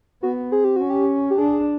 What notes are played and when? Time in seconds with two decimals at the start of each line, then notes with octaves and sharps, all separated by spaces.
0.23 B3 F#4
0.51 C4 G#4
0.64 G4
0.76 C#4 F#4
0.90 G4
1.30 G4
1.38 D4 G#4